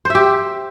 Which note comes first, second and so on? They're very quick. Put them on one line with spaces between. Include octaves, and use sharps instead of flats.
C5 E5 G4